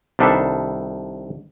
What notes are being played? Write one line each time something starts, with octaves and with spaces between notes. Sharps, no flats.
C2 D#3 D4 A4 B4 E5